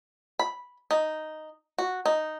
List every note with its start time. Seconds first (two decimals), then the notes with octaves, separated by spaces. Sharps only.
0.39 B5
0.91 D#4
1.78 F#4
2.05 D#4